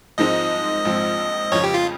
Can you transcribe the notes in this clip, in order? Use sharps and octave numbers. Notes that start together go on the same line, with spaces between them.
G#2 F3 G#3 C4 D#4 D#5
A#1 G#2 F3 C4
F2 C#3 F3 C#5
G4
F4